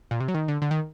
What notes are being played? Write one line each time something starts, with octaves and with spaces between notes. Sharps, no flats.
A#2
C3
F#3
D#3
D3
D3
D#3